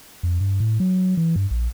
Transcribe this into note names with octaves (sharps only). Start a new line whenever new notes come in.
F2
G2
A2
F#3
E3
G2
A#1